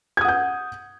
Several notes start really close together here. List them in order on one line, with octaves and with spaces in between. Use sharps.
G#6 D#6 F#5 G6